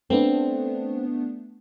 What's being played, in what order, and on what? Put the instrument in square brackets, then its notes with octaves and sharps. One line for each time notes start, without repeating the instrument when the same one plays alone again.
[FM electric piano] A3 B3 D4 [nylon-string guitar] C4